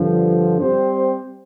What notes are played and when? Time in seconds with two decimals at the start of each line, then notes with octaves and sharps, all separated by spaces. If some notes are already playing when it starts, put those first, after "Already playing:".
Already playing: G2 D3 F3
0.61 G3 C4 G4 C5